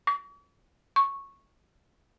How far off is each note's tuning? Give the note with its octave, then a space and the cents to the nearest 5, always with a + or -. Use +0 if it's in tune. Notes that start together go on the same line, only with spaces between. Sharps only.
C#6 +45
C#6 -10